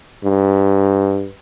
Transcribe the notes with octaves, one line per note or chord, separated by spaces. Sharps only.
G2